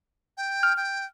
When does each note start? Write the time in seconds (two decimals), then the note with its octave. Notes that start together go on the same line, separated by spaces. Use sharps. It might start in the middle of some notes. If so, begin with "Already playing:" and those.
0.37 G5
0.63 F6
0.77 G5